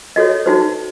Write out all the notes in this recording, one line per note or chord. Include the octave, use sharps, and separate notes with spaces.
F#4 A4 C#5 D#5
D#4 F#4 C5